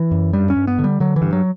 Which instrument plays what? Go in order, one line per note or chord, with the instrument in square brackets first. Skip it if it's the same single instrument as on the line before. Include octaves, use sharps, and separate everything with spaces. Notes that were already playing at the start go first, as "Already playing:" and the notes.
Already playing: [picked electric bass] E3
F#2
G2 G3
C#4
G2
B3
D3
G3
D3 F#3
E3
G2
F#3